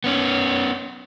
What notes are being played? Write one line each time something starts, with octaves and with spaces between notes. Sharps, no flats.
B3 C#4